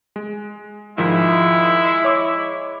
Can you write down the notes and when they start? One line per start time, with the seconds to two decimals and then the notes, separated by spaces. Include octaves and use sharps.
0.16 G#3
0.98 G#2 D#3 F3 G#3 E4
2.04 C#5 D6